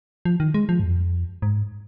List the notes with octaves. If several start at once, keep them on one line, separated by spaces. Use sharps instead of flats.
F3
D#3
G#3
F3
G#2
F2
G#2